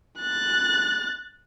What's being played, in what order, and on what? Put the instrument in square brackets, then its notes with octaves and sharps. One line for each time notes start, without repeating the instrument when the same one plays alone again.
[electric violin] F#6 A6